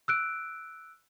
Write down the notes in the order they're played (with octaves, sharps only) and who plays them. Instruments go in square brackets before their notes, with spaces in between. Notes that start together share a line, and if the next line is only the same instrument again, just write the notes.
[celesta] E6 F#6 D7